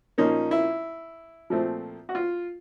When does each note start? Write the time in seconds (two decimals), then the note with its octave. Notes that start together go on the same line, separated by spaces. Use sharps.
0.18 A#2 F3 A#3 C#4 D#4
0.51 E4
1.50 A#2 F3 A3 C4
2.09 F#4
2.15 F4